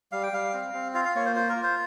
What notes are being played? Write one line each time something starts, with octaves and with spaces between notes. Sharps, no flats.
G3 F5
G5
G3 F5
C4
C4
F4 F5
F5
A#3 C#5
C5
F4 C5
A#4
F4
C5